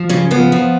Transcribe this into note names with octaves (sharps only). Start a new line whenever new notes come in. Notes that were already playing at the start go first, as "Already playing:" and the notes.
Already playing: F3
C#3 C#4
F3 B3
F3